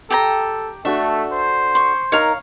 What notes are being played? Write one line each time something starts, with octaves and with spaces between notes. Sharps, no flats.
G4 A4 G5 A#5
A3 D4 F#4 A4 E5
C5
C6 C#6
D#4 A#4 C#5 F5 A#5